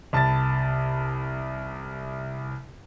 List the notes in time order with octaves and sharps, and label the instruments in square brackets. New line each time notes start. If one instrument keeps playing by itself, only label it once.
[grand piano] C2 A5 B5 A6